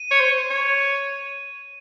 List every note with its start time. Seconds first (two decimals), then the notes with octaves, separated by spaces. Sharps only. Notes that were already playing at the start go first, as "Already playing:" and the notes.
Already playing: D#7
0.11 C#5
0.20 C5
0.50 C#5